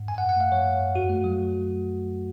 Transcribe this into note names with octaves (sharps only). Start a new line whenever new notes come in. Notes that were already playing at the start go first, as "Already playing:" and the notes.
Already playing: G#2
F#2 G#5
F#5
F#2
F#5
A3 F5
F3 C#5
F#2
F#2
F2 F#4
A3
F#3